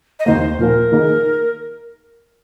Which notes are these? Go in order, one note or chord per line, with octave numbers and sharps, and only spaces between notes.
D#5
D#2 D#3 A#3 C5
A#2 F3 A#3 A#4
D#3 A#3 D#4 G#4